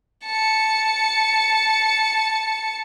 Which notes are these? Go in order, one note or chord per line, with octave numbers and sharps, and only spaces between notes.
A5 C#7